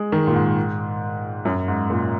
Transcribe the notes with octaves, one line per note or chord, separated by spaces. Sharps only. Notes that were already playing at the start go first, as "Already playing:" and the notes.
Already playing: G#3
D#3
A#2
G#2
F#2
G#2
A#2